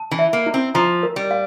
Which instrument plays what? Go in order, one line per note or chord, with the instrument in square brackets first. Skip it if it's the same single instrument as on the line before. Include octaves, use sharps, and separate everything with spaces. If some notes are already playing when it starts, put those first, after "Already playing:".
Already playing: [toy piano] A5
[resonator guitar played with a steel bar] E3
[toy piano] E5
[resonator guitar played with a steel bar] A#3
[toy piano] E4
[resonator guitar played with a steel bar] C4
[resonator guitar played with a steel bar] F3 [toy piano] A#5
[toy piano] A#4
[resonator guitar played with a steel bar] G3
[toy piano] F5